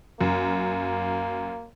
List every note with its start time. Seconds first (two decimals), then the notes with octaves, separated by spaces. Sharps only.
0.21 F#2 A#3